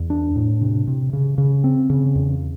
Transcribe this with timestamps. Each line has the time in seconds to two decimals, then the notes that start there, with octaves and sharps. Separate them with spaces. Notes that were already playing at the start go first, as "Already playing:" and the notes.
Already playing: E2
0.10 D4
0.36 A2
0.61 C3
0.87 C3
1.13 C#3
1.38 C#3
1.64 C4
1.90 C#3
2.15 E2